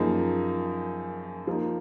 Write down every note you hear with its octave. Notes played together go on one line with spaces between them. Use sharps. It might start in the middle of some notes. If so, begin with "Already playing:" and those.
Already playing: F#2 F3 A#3 D#4 G#4
F3 A#3 D#4